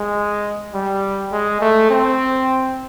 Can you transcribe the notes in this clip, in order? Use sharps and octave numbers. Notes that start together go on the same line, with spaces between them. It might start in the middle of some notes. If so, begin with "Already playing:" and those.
Already playing: G#3
G3
G#3
A3
C4